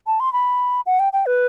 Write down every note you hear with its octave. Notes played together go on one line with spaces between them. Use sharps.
A5
C6
B5
F#5
G5
G5
B4